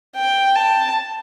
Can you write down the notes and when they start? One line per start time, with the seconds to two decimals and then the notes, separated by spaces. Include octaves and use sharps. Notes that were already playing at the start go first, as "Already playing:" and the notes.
0.16 G5
0.56 A5